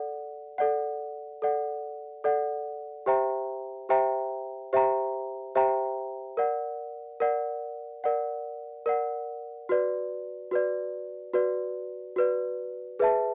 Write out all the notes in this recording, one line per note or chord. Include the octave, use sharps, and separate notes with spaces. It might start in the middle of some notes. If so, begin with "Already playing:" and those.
Already playing: A4 D5 F#5
A4 D5 F#5
A4 D5 F#5
A4 D5 F#5
G4 C5 E5 G5 A#5
G4 C5 E5 G5 A#5
G4 C5 E5 G5 A#5
G4 C5 E5 G5 A#5
A#4 D5 F#5
A#4 D5 F#5
A#4 D5 F#5
A#4 D5 F#5
F#4 B4 D5
F#4 B4 D5
F#4 B4 D5
F#4 B4 D5
G#4 B4 E5 A5